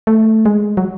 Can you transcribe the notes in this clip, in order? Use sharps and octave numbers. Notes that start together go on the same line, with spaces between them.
A3
G#3
F#3